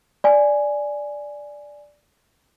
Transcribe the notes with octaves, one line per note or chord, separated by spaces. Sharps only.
D5 G#5